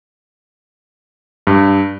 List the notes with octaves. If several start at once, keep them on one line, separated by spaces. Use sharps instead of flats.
G2